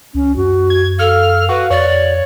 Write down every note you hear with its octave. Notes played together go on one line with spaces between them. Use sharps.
C#2 C#4
F#2 F#4
G#6
A4 F5 F6
F#4 B4
F2 C#5 D5